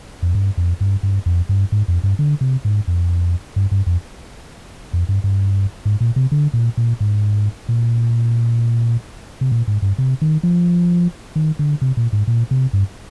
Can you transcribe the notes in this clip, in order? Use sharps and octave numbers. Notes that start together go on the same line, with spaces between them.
F2
G2
F2
G2
G2
F2
G2
G#2
F2
G2
D3
C3
G#2
F2
G2
G2
F2
F2
G2
G2
G#2
A#2
C3
D3
A#2
A#2
G#2
A#2
C3
A#2
G#2
G2
C3
D#3
F3
D#3
D3
C3
A#2
G#2
A#2
C3
G2